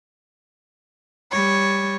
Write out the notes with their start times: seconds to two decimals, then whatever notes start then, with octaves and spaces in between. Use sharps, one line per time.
1.32 G3 C#5